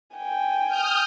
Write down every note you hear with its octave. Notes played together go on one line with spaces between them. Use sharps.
G5 G#5
D#6 F6 G6